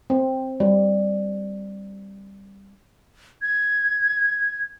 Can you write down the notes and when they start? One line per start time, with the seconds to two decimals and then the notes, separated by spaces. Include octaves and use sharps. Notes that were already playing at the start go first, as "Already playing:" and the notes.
0.10 C4
0.60 G3
3.42 G#6